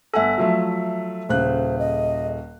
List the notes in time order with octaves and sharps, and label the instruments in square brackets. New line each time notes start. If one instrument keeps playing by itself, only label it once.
[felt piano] G1 F#5 G#5 [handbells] A4 E5
[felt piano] F3 F#3 A3
[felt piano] D#1 C#3 F#6 [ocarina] C5
[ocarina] D#5